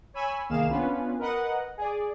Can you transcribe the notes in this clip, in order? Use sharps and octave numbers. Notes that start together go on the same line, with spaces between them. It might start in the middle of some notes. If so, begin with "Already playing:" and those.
C#5 G#5 B5 E6
C2 D#3 A#3 G#4 F5 E7
B3 C#4 D4 F4 B4
A#4 B4 D#5 F#5
G#4 D5